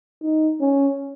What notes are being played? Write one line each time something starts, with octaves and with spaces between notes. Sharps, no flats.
D#4
C#4